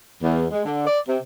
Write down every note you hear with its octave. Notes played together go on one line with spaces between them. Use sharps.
E2
G#3
D3
D5
C3